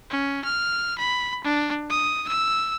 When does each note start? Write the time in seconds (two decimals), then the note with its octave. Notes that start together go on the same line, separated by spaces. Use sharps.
0.10 C#4
0.44 F6
0.99 B5
1.44 D4
1.90 D#6
2.28 E6